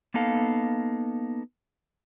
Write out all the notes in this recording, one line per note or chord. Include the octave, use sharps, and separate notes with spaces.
A#3 B3 D#4 A4 F5